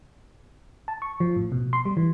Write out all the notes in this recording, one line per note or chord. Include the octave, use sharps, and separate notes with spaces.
A5
C#6
F3
A2
B2
C6
G3
E3